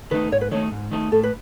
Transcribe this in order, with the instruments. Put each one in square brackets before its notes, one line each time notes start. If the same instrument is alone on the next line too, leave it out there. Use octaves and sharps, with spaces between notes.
[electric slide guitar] D#3 A3 D#4 [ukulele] B4
[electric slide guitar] G#2 [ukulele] C#5
[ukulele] B4
[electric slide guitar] D#3 A3 D#4 [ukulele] C#5
[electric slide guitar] G#2
D#3 A3 D#4
[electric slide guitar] A2 [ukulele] A4
[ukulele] B4